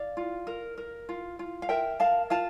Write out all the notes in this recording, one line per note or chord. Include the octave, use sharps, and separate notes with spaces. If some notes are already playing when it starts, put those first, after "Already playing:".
Already playing: D5 F5
F4
A#4
A#4
F4
F4
F5
A#4 E5 G5
A#4 F5 A5
F4 F5 A5